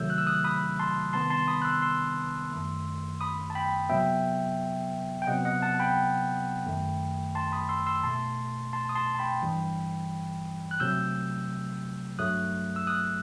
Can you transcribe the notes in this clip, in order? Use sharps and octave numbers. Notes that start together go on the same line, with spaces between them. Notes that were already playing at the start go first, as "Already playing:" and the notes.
Already playing: C3 D#3 F#3 A3 E6 G6
F#6
E6
D#6 F#6
B5 D#6
A5 C6
C3 D#3 G3 B3 A5 C6
A5 C6
B5 D#6
F#6
C6 E6
C6 E6
F#2 D#3 A3
B5 D#6
A5
G5 B5
C3 F#3 B3 E5 G5
G5
C3 F#3 B3 D#5 F#5
D#5 F#5
F#5 A5
G5 B5
F#2 D#3 A3
A5 C6
B5 D#6
C6 E6
C6 E6
B2 A3 A5 C6
A5 C6
D#6
A5 C6
A5
G5 B5
G2 E3 G3
F#6
C3 F#3 A3 E6 G6
G2 F#3 A3 D#6 F#6
E6
D#6 F#6